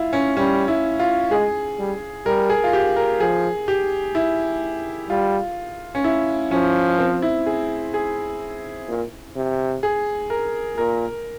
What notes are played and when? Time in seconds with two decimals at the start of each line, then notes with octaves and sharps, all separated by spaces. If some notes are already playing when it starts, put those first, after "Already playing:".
Already playing: E4 F4
0.13 C#4
0.36 G3 C#4
0.68 E4
0.99 F4
1.31 G#3 G#4
1.79 G3
2.26 G3 A#4
2.50 G#4
2.64 F4
2.73 G4
2.96 A#4
3.20 F3 G#4
3.68 G4
4.15 E4
5.10 G3 F4
5.95 C#4
6.04 E4
6.51 F3 C#4
6.99 C4
7.22 E4
7.46 G#4
7.94 G#4
8.88 A#2
9.36 C3
9.83 G#4
10.30 A#4
10.77 A#2 A#4